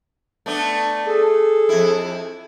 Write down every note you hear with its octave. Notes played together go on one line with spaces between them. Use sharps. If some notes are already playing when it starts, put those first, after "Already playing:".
A3 B3 D4
G#4 A4
F2 E4